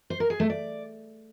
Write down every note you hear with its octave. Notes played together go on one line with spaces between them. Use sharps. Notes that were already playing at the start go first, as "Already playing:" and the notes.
C5
A#4
G#4
A3
D5